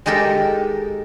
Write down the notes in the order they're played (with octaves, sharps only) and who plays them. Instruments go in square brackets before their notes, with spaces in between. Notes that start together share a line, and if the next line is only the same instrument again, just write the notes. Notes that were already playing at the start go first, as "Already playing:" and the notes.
[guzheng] G#3 D#4 G4 A4 A#4